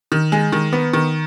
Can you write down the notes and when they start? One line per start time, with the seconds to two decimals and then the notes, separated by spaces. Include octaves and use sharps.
0.12 D#3
0.32 G#3
0.52 D#3
0.73 B3
0.93 D#3